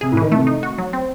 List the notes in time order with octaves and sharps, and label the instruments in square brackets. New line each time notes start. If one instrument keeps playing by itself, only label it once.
[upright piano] C3 [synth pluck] G#4
[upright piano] A2
[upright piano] D#3 [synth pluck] E3
[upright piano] C3 [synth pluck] A3
[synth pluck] D#4
F#4
F#3
C4